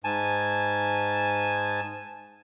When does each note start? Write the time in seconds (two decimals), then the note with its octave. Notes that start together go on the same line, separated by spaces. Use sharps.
0.04 G#2 G#5 A5